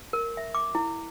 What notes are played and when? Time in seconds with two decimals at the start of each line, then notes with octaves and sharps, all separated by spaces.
0.13 A#4
0.37 E5
0.55 D6
0.75 E4